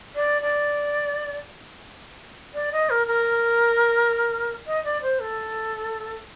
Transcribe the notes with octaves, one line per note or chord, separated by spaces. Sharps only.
D5
D5
D5
D#5
A#4
A#4
D#5
D5
C5
A4